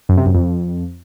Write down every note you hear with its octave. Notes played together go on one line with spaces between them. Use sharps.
F#2
C3
F#2
F2